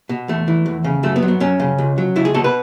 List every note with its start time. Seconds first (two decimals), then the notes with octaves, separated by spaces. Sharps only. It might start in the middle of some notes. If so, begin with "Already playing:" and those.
0.09 B2
0.28 E2 A3
0.48 E3
0.66 E2
0.84 C#3
1.03 F#2 A3
1.16 B3
1.22 F#3
1.28 B3
1.40 F#2 C#4
1.60 C#3
1.78 C#2
1.98 F#3
2.16 C#2 E4
2.25 G#4
2.34 B2 A4
2.44 B4